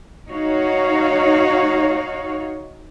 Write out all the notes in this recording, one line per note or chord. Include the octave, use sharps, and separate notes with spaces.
D#4 F#4 C#5 F5